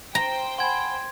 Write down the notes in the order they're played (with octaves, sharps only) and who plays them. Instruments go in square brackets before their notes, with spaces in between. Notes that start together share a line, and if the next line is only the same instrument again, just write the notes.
[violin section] C5 G5 [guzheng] A#5
[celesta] F#5 G#5 B5 [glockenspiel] C6 G#6